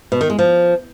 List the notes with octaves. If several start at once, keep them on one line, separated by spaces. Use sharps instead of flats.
B2
D#3
G#3
F3